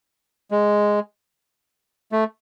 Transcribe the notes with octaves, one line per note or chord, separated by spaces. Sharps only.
G#3
A3